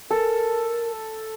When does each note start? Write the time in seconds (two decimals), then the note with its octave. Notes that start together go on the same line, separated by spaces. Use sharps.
0.11 A4 A#4